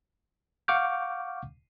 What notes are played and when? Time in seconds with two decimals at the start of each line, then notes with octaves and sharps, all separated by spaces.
0.68 F5 F#5 C#6 D6 F6 G6